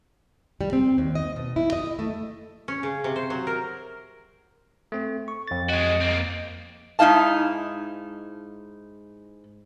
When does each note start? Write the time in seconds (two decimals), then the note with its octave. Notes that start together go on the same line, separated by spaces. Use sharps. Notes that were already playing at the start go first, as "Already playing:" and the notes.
0.61 G3
0.73 C4
0.98 D#2
1.15 D#5
1.36 B2
1.56 E4
1.73 D#5
1.99 A3
2.68 C#4
2.83 C#3
3.04 C3
3.16 C5
3.30 F#3
3.47 A#4
4.92 A3 C4
5.28 C#6
5.48 F2 A6
5.69 G#3 F#4 D#5
6.01 A#3 C4
6.99 G#2 D#4 E4 F5 A5